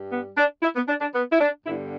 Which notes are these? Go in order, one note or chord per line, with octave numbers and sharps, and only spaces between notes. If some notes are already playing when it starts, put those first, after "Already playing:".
Already playing: G2 G3
B3
D4
E4
B3
D4
D4
B3
E4
D4
G2 D3 G3 B3 E4